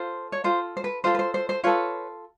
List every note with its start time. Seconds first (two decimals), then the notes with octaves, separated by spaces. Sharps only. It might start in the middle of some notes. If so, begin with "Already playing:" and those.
Already playing: F4 A4 C5
0.32 C#5
0.44 F4 A4 C5
0.77 C5
0.84 B4
1.04 F4 A4 C5
1.15 B4
1.19 C5
1.34 C5
1.49 C5
1.64 F4 A4 B4 C#5